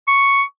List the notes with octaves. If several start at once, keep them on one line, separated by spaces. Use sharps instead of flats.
C#6